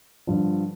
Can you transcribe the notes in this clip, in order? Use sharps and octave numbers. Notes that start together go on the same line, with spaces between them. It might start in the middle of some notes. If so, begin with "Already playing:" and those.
G2 D3 F3